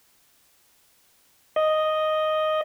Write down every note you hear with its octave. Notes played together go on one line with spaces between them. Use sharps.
D#5